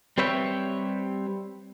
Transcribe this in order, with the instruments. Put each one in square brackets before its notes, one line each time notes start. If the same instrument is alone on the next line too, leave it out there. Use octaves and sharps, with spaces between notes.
[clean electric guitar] G3 C4 B4 C#5 E5 G5